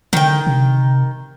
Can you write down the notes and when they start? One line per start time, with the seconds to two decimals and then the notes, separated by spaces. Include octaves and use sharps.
0.13 D3 D#3 G5
0.47 C3